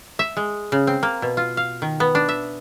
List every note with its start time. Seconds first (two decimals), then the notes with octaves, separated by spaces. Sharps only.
0.19 E5
0.37 G#3
0.72 C#3
0.87 C4
1.03 A#3
1.22 B2
1.37 F4
1.57 F5
1.82 D#3
2.00 B3
2.15 D4
2.29 E5